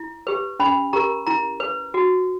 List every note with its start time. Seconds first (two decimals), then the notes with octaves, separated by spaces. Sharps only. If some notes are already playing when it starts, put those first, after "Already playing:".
Already playing: E4
0.27 G4 B4
0.60 C#4 B5
0.93 G4 A#4 A#5
1.27 E4 A#5
1.60 B4
1.94 F#4